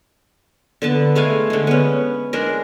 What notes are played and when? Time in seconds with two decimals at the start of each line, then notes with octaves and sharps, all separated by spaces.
0.82 D3 B3 A5
1.15 G#3 A3 F5 G#5
1.50 D3 G#3
1.67 B3 C#4
2.33 G#3 D4 G#4 A#4